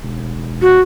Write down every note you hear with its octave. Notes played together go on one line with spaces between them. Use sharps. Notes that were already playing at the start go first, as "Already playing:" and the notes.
E1
F#4